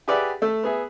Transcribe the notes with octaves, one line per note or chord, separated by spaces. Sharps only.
G4 G#4 B4 D5 E5 F#5
A3 A4
B3 G#4 E5